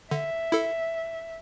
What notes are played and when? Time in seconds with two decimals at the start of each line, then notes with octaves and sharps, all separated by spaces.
0.11 D3 E5
0.52 E4 A4